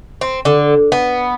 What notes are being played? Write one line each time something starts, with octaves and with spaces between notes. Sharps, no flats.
C4
D3
B3